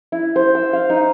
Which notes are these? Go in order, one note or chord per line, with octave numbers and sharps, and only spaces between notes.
E4
C5
E6
F5
D#4